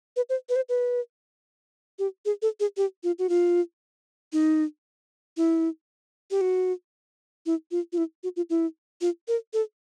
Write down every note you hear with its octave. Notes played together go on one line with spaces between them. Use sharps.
B4
C5
B4
C5
B4
G4
G#4
A4
G#4
G4
F4
F#4
F4
D#4
E4
G4
F#4
E4
F4
F4
E4
F#4
F4
E4
F4
A#4
A4